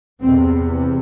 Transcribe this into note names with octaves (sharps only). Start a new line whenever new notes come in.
E2 C3 C4